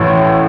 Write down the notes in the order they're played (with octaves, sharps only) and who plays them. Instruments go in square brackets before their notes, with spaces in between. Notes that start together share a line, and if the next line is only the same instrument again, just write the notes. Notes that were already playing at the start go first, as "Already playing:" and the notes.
Already playing: [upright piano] A1 A2 E3